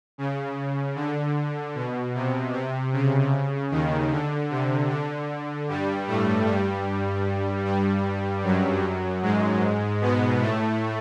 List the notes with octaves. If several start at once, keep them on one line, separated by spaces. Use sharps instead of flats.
C#3
D3
B2
C3
C3
C#3
D#2 D#3
D3
C3
D3
G2 G3
A2 A3
G2 G3
G2 G3
F#2 F#3
G#2 G#3
B2 B3
A2 A3